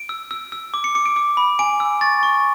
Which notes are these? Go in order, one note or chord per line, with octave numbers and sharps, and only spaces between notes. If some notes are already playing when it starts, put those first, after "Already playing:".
Already playing: D7
E6
E6
E6
D6
C#7
D6 C#7
D7
D6
B5
G#5 D7
E6
C#6 A6
C#6